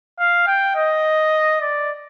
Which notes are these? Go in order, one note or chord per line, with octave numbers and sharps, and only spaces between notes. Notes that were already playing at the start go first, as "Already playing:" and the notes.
F5
G5
D#5
D5